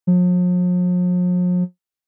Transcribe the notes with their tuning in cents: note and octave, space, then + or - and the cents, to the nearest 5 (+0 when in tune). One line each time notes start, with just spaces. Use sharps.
F3 +45